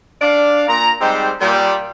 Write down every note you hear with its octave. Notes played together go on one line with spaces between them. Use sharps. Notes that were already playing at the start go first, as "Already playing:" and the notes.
D4 D5 F5
A#2 A#5
G#2 G3 C4 D#4 G4 C5
A#2 G3